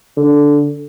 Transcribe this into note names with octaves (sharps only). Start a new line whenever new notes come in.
D3